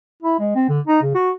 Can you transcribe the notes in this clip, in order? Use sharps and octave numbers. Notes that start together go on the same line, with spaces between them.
E4
G#3
C4
D3
D#4
C#3
F#4